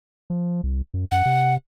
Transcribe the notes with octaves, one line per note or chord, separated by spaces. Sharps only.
F3
C2
F#2
F#2 F#5
C3